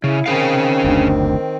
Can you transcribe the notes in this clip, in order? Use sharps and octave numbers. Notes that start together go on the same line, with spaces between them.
C#3 E4
D#3 C4 C#4 G#4 F5
F#1 D2 D4